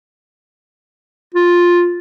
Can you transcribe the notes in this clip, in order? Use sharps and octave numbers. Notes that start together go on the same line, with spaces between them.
F4